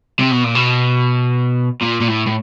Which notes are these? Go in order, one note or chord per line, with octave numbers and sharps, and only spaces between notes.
C3
B2
A#2
B2
A#2
A#2
A2
A2